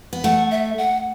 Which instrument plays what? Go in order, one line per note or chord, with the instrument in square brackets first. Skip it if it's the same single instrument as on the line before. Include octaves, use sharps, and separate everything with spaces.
[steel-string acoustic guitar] B3
[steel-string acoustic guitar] A3 [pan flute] F#5
[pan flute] E5
F#5